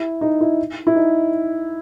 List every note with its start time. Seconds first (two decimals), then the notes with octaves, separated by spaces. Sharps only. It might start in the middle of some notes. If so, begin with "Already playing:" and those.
Already playing: E4
0.21 D#4
0.41 E4
0.87 E4
0.95 D#4